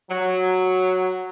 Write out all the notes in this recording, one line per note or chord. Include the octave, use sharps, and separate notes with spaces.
F#3